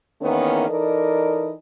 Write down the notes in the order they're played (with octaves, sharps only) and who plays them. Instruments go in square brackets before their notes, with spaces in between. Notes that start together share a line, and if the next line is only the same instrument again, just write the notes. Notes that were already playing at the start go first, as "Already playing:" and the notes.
[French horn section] E2 D#3 E3 A#3 B3 C#4
E3 D#4 A4 A#4 D5 D#5